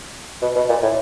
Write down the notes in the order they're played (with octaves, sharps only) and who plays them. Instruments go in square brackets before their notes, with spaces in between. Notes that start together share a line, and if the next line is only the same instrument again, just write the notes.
[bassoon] B2
B2
A#2
A2